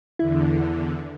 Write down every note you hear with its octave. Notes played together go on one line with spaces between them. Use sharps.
E2 D3 E4